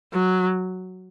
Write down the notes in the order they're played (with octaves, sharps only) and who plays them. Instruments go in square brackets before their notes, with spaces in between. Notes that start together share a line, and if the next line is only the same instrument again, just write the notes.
[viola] F#3